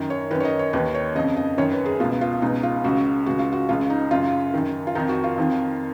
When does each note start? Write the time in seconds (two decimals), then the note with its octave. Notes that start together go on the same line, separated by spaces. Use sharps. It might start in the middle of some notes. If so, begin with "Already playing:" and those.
Already playing: F#2 D#3
0.10 C#5
0.31 D#3 B4
0.35 F#2
0.40 C#5
0.45 D#5
0.59 C#5
0.73 D#2 D#3 B4
0.95 C#5
1.15 C#3 D#5
1.19 F2
1.37 D#5
1.58 F#2 D#3 C#5
1.71 B4
1.86 G#4
2.00 C#2 B2 F4
2.21 F4
2.42 C#2 B2 D#4
2.63 F4
2.84 C#2 C#3 F#4
3.26 C#2 C#3 F#4
3.39 F4
3.52 F#4
3.69 C#2 C#3 F4
3.90 D#4
4.11 F#2 C#3 F4
4.54 F#2 D#3
4.87 F4
4.95 F2 D#3 D#4
5.09 F#4
5.24 F4
5.38 F2 D#3